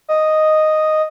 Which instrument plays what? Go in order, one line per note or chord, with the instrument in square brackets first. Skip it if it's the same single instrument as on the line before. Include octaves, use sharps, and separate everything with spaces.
[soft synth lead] D#5